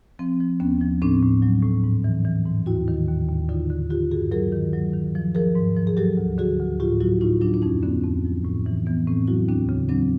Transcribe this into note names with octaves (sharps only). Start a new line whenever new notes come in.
F3 C4
F3
D#2 B3 C#4
F3
A2 C4 D4
A2
F#3
A2
G#2
E3
E3
G#2
D#2 E4 F#4
D#3
D#2
D#2
D3 D#4 F4
D3
D3 F4 G4
G2 F#4 G#4
F#3 G#4 A#4
D#3
F#3
D#3
F3
F3 G#4 A#4
G#2
F3
G#4
F#3 G4 A4
D2
D3 F#4 G#4
D2
A2 F4 G4
F#3 E4 F#4
A2 D#4 F4
F#3 D4 E4
D4
F2 C#4 D#4
D3 B3 C#4
F2 C4
F3
A2
E3
E3 B3
A2 C4
F#3 E4 F#4
D#2 C4 D4
C#3
F#3 C4 D4